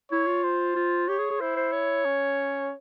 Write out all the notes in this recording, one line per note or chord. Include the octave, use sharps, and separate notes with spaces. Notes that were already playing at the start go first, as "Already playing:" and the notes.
E4 C#5
F4
C5
F4
G4 C#5
G#4
G#4
E4 C5
C5
C#5
C#4